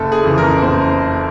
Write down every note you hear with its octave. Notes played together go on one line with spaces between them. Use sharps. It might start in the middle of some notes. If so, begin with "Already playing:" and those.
Already playing: F#1 A4
G#4
F2 C#3 E3
A#4
F#1 C5